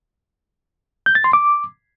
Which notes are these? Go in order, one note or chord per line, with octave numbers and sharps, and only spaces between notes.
G6
A6
C6
D6